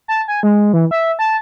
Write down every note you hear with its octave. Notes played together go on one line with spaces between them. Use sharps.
A5
G#5
G#3
E3
E5
A5